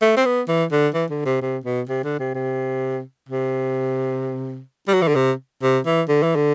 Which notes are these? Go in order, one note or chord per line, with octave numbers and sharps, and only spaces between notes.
A3
C4
B3
E3
D3
E3
D3
C3
C3
B2
C3
D3
C3
C3
C3
G3
F#3
E3
D3
C3
C3
E3
D3
E3
D3